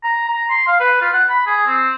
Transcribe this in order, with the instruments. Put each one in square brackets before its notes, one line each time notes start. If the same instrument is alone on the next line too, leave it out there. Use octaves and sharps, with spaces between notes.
[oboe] A#5
A#5
C6
F5
B4
F4
F#5
B5
G#4
C4